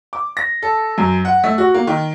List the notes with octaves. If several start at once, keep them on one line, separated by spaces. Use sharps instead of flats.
D6
A#6
A4
F#2
F#5
A3
F#4
A#3
D#3